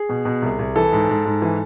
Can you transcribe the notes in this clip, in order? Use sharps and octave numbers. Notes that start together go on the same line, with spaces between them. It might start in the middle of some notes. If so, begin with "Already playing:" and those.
Already playing: G#4
B2
B2
C2
C2
E3 A4
G#2
G#2
G#2
E3